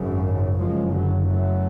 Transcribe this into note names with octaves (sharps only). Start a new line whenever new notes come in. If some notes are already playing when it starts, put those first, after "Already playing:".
Already playing: G#1 F#2 C#3
F#1 F#2 C#3 F3 G#3
D3 F#3
F#3 A3